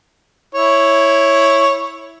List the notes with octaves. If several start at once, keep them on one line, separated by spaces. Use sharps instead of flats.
E4 C#5